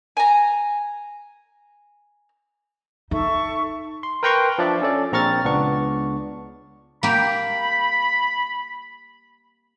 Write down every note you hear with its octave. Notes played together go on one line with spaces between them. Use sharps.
G#5 A#5
D#4 A4 E5 C#6
C6
A#4 B4 G5 A#5 C6 C#6
F3 D4 D5 E5
C#4 A4 D5
A#1 C4 A#5 C#6 F6 A6
C#2 B3 D4 C#6
A#3 G4 B5